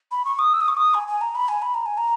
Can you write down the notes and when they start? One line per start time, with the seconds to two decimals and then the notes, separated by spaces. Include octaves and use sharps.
0.11 B5
0.25 C#6
0.39 D#6
0.53 E6
0.60 D#6
0.68 C#6
0.77 D#6
0.94 G#5
1.08 G#5
1.21 A#5
1.35 B5
1.48 G#5
1.62 B5
1.74 A#5
1.86 G#5
1.97 A#5